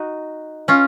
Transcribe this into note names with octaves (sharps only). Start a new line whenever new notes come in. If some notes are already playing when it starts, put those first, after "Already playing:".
Already playing: D#4 F#4
C#4 F4